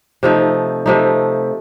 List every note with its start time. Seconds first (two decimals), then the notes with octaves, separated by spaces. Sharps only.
0.23 C3 F3 A3 D#4
0.86 C3 F3 A3 D#4